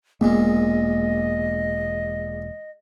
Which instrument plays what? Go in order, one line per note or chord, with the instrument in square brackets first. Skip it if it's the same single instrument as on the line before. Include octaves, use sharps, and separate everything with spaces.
[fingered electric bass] E1 A#3 B3 [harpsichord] A#1 A#2 G#3 [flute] D#5